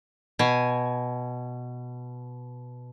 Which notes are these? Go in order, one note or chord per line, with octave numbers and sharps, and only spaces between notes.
B2 G#5